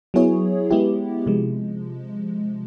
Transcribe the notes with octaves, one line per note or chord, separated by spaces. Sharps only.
F#3 B3 E4 G#4 C#5
G#3 B3 E4 G4
C3 F3 G#3